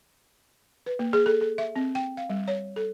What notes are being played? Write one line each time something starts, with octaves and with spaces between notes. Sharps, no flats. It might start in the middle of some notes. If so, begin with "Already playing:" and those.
B4
A#3
G#4
A4
A4
E5
C4
G5
F5
G3
C#5
A4